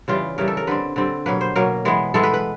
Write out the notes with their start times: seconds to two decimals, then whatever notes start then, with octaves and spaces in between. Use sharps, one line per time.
0.08 C#3 E3 G3 F4
0.38 C#3 E3 G3 A#4
0.48 A4
0.57 A#4
0.67 D3 G3 C4 B4
0.96 D3 G3 C4
1.26 B2 F#3 A#3 B4
1.41 C5
1.56 B2 F#3 A#3 A#4
1.85 E3 G#3 B3
2.14 E3 G#3 B3 A4
2.23 B4
2.34 B4